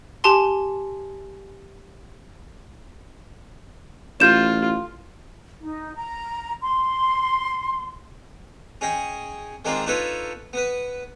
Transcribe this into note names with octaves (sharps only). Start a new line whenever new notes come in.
G4 G#5 A5 C6
A1 F4 G6 E7
D#4
A#5
C6
C#4 G#4 D#5 G5
D#3 G#3 A#3 C4 D4 F4
D4 D#4 F4 A4 B4 C#5
B3 B4